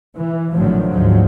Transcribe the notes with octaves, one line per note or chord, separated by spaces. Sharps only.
E3
G#1 A2 D3 D#3 F3 F#3
D2 G#2 F3 F#3